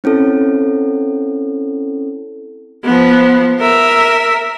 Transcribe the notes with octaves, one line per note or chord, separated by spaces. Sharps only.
C4 C#4 E4 A4
F3 B3
A#4 E5